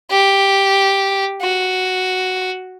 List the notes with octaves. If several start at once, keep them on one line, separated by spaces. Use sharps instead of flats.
G4
F#4